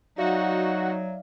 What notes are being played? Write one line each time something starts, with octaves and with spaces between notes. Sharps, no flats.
F#3 D#4 F#4 D5 E5 F5